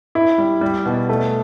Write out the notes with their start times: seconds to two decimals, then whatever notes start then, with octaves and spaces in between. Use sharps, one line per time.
0.15 E4
0.38 G3
0.61 G3
0.86 B2
1.09 A3